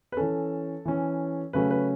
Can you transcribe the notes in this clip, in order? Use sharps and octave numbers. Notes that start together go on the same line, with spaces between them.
B4
E3 C#4 A4
E3 C#4
C#3 F#3 A3 C#4 B4
B4